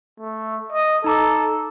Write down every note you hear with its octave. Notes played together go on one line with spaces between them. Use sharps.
A3
D#5
D#4 A4 A#5 D6